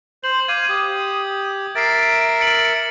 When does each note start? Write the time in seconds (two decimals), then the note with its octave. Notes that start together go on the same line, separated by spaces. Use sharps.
0.24 C5 F#7
0.48 F5 D6 G#6 D#7
0.69 G4 D#6
1.75 A#4 E5 A6 C7 D7
2.40 A6 C#7 F#7